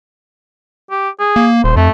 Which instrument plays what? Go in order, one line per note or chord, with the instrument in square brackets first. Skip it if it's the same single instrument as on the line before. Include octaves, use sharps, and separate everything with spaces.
[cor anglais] G4
G#4
[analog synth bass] A#3
[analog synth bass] D#1 [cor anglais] C5
[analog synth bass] F2 [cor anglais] A3